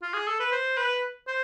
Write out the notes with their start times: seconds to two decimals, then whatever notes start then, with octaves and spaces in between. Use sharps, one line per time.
0.02 F4
0.14 G#4
0.27 A4
0.40 B4
0.52 C5
0.77 B4
1.27 C5